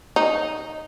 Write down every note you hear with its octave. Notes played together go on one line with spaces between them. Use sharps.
D#4